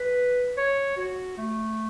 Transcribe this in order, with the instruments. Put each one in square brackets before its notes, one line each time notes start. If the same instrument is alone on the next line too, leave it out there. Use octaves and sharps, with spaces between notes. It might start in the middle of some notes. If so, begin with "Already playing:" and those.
Already playing: [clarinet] B4
C#5
F#4
A3